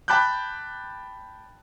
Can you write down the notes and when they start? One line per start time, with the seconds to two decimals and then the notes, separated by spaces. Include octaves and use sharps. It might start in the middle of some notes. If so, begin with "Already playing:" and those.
0.08 G5 A5 B5 D6 F#6 G6